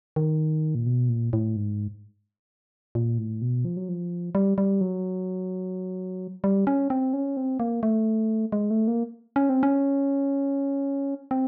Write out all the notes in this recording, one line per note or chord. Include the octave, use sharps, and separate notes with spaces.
D#3
A#2
B2
A#2
A2
G#2
A#2
A2
B2
F3
F#3
F3
G3
G3
F#3
G3
C#4
C4
C#4
C4
A#3
A3
G#3
A3
A#3
C#4
C4
C#4
C4